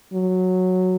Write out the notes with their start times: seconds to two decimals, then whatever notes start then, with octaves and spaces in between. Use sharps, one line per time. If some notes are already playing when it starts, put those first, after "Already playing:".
0.14 F#3